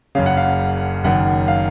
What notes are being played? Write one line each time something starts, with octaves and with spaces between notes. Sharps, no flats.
F#1 F#2 C#3 F5
F#5
F5
F#1 F#2 D#3 F#5
F5